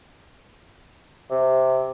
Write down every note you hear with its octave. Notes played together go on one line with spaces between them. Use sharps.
C3